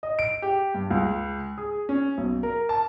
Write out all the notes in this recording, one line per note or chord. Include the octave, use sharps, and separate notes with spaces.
D#5
D7
G4
G2
C#2
G#4
C#4
B1
A#4
A5